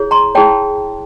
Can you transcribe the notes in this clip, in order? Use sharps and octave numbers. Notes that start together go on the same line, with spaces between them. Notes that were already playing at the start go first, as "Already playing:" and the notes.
Already playing: E4 G#4 C#5
A#5 C6
E4 G#4 C#5 G5 A5